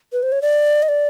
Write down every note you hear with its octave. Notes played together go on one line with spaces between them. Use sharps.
B4
C5
C#5
D5
D#5
D5